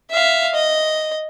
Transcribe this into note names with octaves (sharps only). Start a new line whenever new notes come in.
E5 F5
D#5